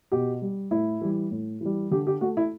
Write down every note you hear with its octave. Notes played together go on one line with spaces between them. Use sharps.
B2 G4
G3
A2 E4
E3 G3
A2
E3 G3
D3 G4
G4
A3 F#4
E4